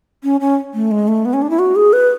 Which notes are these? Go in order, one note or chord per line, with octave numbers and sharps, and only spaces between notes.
C#4
C#4
A3
G#3
A3
B3
C#4
D4
E4
F#4
G#4
B4